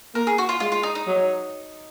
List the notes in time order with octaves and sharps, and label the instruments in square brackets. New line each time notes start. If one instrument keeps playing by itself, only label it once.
[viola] A#3 [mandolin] A#4
[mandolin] G#4
F#4
F4
[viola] G#3 [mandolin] F4
[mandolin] F4
D#4
D#4
[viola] F#3